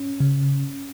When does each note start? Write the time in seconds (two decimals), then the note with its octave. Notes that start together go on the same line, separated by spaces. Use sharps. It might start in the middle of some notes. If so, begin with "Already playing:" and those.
Already playing: C#4
0.20 C#3